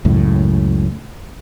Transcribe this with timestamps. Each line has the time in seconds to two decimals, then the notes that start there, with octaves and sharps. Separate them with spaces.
0.05 C#2 F#2 A2